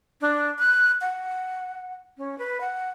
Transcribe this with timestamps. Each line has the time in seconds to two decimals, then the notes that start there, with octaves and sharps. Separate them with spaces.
0.21 D4
0.59 F#6
1.01 F#5
2.18 C#4
2.38 B4
2.61 F#5